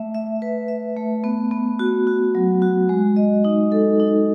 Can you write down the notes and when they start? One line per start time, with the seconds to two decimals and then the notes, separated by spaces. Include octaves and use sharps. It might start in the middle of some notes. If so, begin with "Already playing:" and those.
Already playing: A3 E5
0.14 E5
0.42 B4
0.68 E5
0.97 A3
1.24 B3
1.51 B3
1.79 F#4
2.07 F#4
2.35 F#3
2.62 F#4
2.89 G#3
3.16 D#5
3.45 D#4
3.72 A4
4.00 D#4